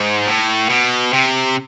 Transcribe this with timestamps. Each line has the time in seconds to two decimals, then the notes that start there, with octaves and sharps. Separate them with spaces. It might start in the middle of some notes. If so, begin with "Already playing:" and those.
Already playing: G#2
0.28 A2
0.70 B2
1.13 C3